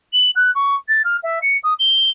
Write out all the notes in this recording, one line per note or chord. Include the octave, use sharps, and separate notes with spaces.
F#7
F#6
C#6
A6
F6
E5
C#7
D#6
G7